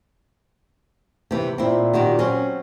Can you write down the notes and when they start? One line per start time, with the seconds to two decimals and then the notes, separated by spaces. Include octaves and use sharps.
1.31 C3 E3
1.58 A#2 C4 E4
1.93 D#3 F#4 G4
2.19 F#3 C4 C#4